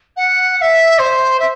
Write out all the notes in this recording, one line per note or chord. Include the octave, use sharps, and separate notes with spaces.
F#5
F#5
E5
C5
E5